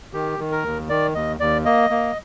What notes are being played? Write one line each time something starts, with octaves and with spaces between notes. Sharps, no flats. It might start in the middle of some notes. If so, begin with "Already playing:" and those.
D#3 G4
D#3
A#4
D#2
D#3 D5
D#2 D#5
D#2 D5
A#3 D#5
A#3